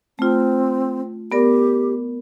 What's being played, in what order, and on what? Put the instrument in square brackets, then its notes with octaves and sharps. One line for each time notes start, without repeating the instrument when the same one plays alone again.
[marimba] A3 F4 [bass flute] C4
[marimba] B3 A#4 D5 [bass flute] G4